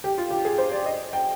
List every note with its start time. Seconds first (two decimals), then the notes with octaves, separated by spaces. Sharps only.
0.04 G4
0.18 F4
0.30 G4
0.45 G#4
0.58 C5
0.71 D5
0.86 D#5
1.13 G5